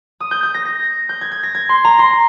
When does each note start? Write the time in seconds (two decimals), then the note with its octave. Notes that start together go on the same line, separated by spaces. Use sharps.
0.20 D#6
0.31 G6
0.43 G6
0.54 A#6
0.65 A#6
1.09 G6
1.21 G#6
1.32 G#6
1.43 A#6
1.55 G#6
1.69 C6
1.85 A#5
1.99 C6